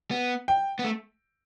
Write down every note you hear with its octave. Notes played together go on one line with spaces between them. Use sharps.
B3
G5
B3
A3